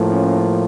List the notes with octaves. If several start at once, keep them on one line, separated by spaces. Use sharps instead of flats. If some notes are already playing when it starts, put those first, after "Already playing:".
Already playing: A2 F3 A#3
C#4